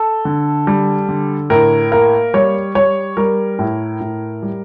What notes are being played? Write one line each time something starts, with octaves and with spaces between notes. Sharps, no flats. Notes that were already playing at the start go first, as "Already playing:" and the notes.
Already playing: A4
D3
G3
D3
A2 A#4
A#3 A#4
G3 C#5
G3 C#5
G3 A#4
A2
A2
G3